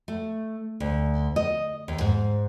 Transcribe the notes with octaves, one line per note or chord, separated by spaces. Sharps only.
A3
D2
D#5
D#2
G#2